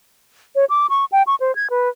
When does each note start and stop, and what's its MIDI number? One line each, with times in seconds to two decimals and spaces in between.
0.56 0.65 73
0.70 0.87 86
0.90 1.05 85
1.12 1.23 79
1.27 1.35 85
1.40 1.55 72
1.56 1.68 92
1.70 1.89 71